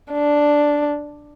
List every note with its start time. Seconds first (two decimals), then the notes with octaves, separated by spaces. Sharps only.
0.12 D4